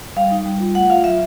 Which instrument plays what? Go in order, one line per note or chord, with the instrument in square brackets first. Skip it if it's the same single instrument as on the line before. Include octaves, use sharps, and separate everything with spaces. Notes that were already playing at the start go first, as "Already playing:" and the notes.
[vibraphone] G3 F5
D#4
G3
F4
A3 F#5
F4 F5
F#3 E5